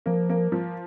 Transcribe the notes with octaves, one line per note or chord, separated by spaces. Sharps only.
F3 A#3
A#3
F3